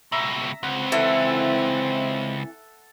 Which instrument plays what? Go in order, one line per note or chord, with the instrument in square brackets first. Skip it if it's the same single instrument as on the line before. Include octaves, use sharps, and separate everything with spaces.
[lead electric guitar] C#2 B2 [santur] E5 A#5
[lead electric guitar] C#2 [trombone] C4 [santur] F#5
[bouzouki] E3 [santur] A4